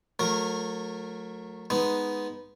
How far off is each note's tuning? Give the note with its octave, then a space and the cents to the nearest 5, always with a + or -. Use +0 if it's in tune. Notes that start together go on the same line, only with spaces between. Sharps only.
F#3 -30 A3 +0 A#4 +0
G#3 +0 B3 +0 D#4 +0